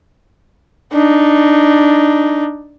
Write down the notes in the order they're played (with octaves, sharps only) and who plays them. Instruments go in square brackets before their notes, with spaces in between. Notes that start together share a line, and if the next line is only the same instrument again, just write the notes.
[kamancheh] D4 D#4